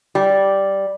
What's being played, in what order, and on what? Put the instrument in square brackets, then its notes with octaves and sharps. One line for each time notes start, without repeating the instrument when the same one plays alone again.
[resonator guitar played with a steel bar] G3